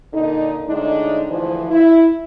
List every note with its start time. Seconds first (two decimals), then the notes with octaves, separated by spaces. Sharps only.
0.13 A#2 D3 D#4
0.67 A2 D3 G#3 D4 D#4
1.30 D2 E3 F3
1.70 E4